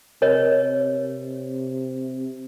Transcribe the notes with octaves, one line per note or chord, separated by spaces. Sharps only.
C3 A#4 C#5 D#5